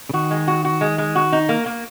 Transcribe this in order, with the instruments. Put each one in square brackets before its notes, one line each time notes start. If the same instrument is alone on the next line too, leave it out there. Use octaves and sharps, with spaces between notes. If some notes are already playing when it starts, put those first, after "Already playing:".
[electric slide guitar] C#3
[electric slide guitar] D#3 [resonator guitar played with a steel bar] F#4
[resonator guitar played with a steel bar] G#3
F#4
F#4
G#3
G#3
F#4
D#4
A#3
A#3